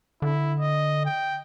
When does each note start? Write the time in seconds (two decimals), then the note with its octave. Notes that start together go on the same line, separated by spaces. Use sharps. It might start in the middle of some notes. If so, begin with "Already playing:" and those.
0.22 D3 E4
0.60 D#5
1.06 G5